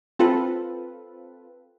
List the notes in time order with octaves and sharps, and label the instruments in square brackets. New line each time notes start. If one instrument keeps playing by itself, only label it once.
[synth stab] C4 F4 A4 B4